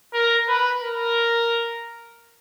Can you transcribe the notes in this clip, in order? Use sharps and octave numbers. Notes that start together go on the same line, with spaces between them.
A#4
B4
A#4